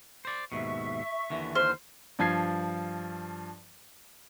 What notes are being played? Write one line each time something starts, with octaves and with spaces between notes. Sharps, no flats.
C5 D5
D#2 G#2 B2 E5 C#6
D#2 D3 E3
C5 F6
G2 F3 A5 G#6 C7